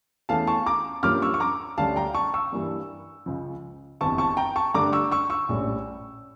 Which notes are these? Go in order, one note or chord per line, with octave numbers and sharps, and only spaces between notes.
E2 E3 A3 C#4 F5 A5
A5 C#6
A#5 D6
G2 F3 A#3 C#4 D6 F6
C#6 E6
C#6
A#5 D6
D2 D3 G3 C#4 F5 A5
G5 A#5
A5 C#6
C#6 E6
G2 E3 G3 A#3
C#2 C#3 F3
G1 F2 E3 A5 C#6
A5 C#6
G5 A#5
A5 C#6
G2 D3 A3 A#5 D6
C#6 E6
C#6 E6
C#6 E6
A#1 A2 G3 C#4